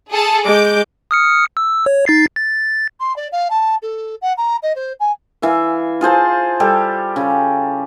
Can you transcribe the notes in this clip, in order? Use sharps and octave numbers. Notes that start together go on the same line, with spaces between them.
G#4 A4 A5
G#3 D6 G6
D#6 F6 C#7
E6
C#5
D#4 A6 C7
A6
C6
D5
F5
A5
A4
F#5
A#5
D#5
C5
G#5
E3 E5 F5
F4 G#4 C5 A5
G3 G4 A4
C#3